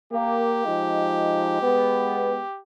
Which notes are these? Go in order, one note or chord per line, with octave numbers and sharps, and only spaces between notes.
A#3 G4
F3 G#3 D#4
G#3 B3